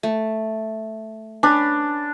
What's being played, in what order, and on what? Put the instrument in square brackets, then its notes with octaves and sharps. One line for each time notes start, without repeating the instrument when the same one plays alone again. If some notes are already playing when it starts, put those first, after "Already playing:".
[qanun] A3
[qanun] C#4 B4 [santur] D4